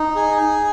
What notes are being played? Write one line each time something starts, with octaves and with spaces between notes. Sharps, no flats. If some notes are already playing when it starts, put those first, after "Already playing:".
Already playing: D#4
G#4